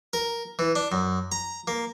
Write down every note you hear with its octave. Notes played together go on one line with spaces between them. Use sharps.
A#4
E3
D4
F#2
A#5
A#3